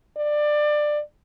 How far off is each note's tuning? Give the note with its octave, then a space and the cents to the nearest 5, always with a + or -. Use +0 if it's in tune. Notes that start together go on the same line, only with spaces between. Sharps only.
D5 +20